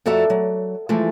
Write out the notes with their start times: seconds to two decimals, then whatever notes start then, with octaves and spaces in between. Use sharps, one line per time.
0.06 F2 F#4 A4 D5 E5 A#5
0.30 F#3
0.89 E3 F3 G#3 A3